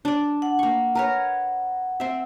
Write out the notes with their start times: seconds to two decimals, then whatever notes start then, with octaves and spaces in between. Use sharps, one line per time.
0.05 D4 D5
0.42 F#5
0.59 A#3 C#6
0.95 A#4 B4 C#5
2.00 C4 E5